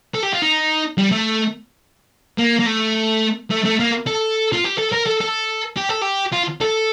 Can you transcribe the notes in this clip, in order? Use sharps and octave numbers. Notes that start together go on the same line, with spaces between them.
A4
G4
F4
D#4
G3
A3
A#3
A#3
A3
A3
A3
A#3
A4
F4
G4
A4
A#4
A4
A4
G4
A4
G4
F4
A4